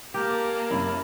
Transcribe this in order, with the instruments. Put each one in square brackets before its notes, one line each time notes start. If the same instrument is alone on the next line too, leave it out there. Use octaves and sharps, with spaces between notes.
[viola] A#3 [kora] G4 [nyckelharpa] A#4 A5
[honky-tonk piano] F#2 [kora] E4